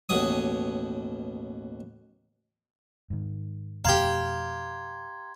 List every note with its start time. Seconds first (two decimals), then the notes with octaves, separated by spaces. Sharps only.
0.09 A1 D#2 B2 C#5 D#6
3.10 G#2 D#3
3.85 F2 B2 A3 G4 F5 A#5 C6 G#6